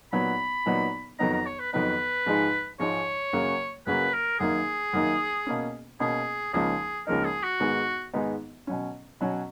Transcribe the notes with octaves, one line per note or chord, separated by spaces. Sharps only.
A#2 F#3 B3 D#4 B5
A#2 F#3 B3 D#4
F2 D#3 F#3 B3 D#4 A#5
A#5
C#5
B4
F2 D#3 F#3 B3 D#4 B4
G#2 F3 G#3 D#4
G#2 F3 G#3 D#4 C#5
F#2 C#3 F#3 A#3
F#2 C#3 F#3 A#3 B4
A#4
F#2 D#3 A#3 D#4 G#4
F#2 D#3 A#3 D#4
B2 A#3 C#4
B2 A#3 C#4 G#4
C#2 C#3 F3 A#3 D#4 G#4
C#2 C#3 F3 A#3 D#4 A#4
G#4
F#4
G#2 D#3 G#3 B3 D#4
G#2 D#3 G#3 B3 D#4
B2 F#3 C#4
B2 F#3 C#4